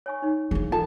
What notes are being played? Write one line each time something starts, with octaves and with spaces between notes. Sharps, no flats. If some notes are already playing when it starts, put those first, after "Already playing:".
C#5 G#5 C#6
D#4 C#5
E3 A#3 G#4
F4 A4 A5